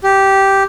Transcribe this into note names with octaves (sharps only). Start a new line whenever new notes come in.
G4